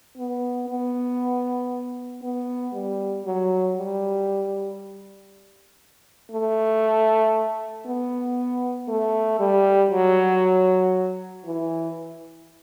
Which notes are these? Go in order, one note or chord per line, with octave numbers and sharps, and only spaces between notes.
B3
B3
B3
G3
F#3
G3
A3
B3
A3
G3
F#3
E3